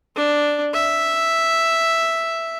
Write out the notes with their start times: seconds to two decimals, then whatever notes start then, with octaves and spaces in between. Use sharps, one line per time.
0.16 D4
0.74 E5